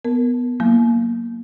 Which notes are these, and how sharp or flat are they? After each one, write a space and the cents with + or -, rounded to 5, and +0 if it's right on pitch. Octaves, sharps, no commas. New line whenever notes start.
B3 +0 A#4 +0
F#3 +0 A#3 +0 E4 +0